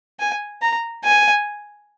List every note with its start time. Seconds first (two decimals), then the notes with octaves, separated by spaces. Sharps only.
0.20 G#5
0.62 A#5
1.04 G#5